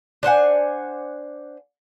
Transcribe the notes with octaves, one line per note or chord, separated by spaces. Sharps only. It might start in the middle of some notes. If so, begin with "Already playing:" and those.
D4 C5 F#5 G#5